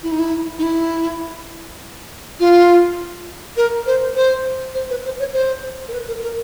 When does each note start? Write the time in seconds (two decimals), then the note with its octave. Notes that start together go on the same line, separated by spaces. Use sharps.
0.03 E4
0.12 D#4
0.19 E4
0.59 D#4
0.63 E4
2.40 F4
3.57 A#4
3.86 C5
4.16 C5
4.74 C5
4.90 B4
5.05 C5
5.20 C#5
5.34 C5
5.88 A#4
5.93 B4
6.08 A#4
6.22 A#4